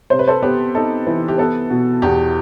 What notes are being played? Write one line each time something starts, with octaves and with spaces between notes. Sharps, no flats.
C3 C5
B4
A4 C5
B3 G4 B4
D#4 A4
E3
G4
B3 A4
B2
E2 G4